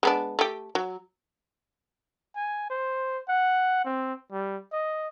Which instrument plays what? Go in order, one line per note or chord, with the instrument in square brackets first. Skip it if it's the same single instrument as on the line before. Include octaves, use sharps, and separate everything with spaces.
[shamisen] G#3 B3 D4
A3 G4
F#3
[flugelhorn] G#5
C5
F#5
C4
G3
D#5